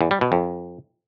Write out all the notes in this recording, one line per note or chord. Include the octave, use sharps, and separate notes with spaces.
E2
G3
B2
F2